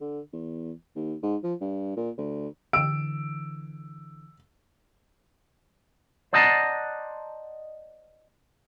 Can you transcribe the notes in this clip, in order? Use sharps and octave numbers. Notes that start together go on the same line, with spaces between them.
D3
E2
D#2
G#2
F3
G2
A#2
D2
D3 E3 E6 D7
C5 D5 D#5 F#5 A5 A#5